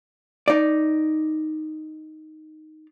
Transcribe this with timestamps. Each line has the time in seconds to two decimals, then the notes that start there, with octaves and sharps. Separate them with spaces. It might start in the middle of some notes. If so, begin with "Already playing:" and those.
0.48 D#4 D5